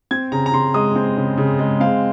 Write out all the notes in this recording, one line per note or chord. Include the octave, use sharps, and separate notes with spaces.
C4 G#6
C#3 A#5
A#5
C#3 C6
G#3 D#6
C4
C#3
C#3
G#3
C4 F5